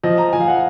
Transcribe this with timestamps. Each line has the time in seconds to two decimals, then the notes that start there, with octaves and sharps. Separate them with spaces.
0.03 F3 D#5
0.18 A#5
0.33 F3 G#5
0.41 F5
0.48 F#5